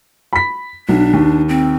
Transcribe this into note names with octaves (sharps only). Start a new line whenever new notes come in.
B5 B6
B1 D4
D#2
C4